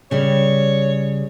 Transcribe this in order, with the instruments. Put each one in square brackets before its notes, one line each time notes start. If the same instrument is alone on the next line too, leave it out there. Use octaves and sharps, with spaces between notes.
[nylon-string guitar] C#3 G3 [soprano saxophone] C#5